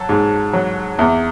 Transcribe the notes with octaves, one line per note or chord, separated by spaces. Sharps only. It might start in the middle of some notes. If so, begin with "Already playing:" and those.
Already playing: F#3 A4
G#2
F#3
E2